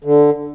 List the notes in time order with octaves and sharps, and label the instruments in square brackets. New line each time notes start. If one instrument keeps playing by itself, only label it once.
[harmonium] D3